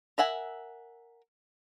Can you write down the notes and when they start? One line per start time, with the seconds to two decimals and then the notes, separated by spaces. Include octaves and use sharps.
0.18 A#4 E5 F#5 G#5